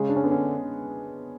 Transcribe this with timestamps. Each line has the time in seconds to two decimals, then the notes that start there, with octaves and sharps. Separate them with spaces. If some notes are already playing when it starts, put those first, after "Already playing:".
Already playing: C#3 G#3
0.09 D4
0.16 C#4
0.24 D3 B3
0.31 C#4